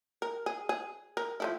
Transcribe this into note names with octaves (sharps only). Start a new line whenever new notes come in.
A#4
G#4
G#4
A#4
F3 A3 E4